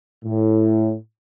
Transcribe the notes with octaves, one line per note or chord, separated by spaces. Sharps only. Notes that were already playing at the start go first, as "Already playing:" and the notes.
A2